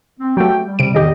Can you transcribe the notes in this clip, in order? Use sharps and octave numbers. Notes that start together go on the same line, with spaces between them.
C4
F#3 A3 F#4 G4 G5
G3
C3 D7
E2 A2 D#3 G4 D#5